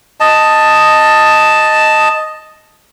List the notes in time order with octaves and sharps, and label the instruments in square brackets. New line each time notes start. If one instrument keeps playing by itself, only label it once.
[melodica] D#5 A5